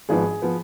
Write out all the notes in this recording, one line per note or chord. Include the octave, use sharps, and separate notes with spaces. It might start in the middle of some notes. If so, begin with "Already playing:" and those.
G#1 G#2 F3 B3 G#4
F3 B3